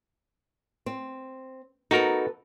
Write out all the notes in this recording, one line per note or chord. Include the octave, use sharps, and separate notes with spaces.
C4
B3 D#4 F#4 A4 A#4